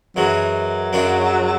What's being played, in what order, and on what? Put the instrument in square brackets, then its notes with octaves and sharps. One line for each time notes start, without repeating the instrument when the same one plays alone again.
[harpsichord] F#2 E3 G#3 [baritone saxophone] F#3
[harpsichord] F#2 C#3 G#3 D4 F#4